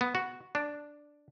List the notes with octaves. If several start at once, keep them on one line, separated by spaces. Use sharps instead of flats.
B3
F#4
D4